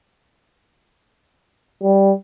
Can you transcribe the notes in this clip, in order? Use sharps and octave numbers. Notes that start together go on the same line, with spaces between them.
G3